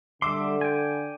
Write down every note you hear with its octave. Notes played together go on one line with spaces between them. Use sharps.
D3 G3 E5 C6 D6
G5 G#5